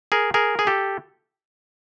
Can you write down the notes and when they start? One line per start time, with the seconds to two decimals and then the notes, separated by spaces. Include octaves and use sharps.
0.12 G#4 A#4
0.34 G#4 A#4
0.59 G#4
0.67 G4 A4